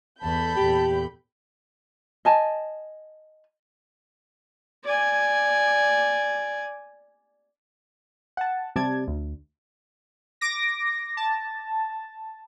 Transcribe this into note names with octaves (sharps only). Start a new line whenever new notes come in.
E2 A4 A5 B5 G6
E2 A#2 G4
D#5 G#5 A5
D5 G#5
F#5 A5
C3 G3 D5 A5 G#6
D2
D6 A#6
A5